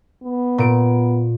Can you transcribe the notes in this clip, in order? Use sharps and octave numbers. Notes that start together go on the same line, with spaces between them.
B3
A#2 D7